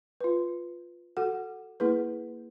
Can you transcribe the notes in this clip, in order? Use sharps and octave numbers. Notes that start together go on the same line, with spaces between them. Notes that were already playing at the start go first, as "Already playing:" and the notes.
F4 B4
F#4 A4 F#5
A#3 E4 G#4 B4